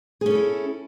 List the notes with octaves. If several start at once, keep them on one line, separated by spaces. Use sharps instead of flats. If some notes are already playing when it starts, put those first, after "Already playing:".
C#4 E4 G#4 A4